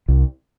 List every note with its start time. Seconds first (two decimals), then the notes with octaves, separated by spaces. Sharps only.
0.08 C2